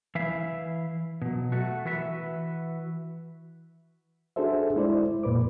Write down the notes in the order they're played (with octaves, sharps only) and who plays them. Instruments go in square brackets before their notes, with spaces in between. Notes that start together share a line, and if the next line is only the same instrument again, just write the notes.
[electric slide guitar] E3 E4 E5 F5
B2 F#3
A3 F#4
E3 F#4 B4 E5
[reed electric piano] D4 F#4 G#4 A4 C5 E5
G#3 E4 C5 D5
F2 A#2 B4 D6